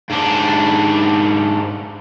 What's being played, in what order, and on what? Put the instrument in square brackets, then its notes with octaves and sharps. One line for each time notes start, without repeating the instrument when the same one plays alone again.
[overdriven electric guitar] G#2 D4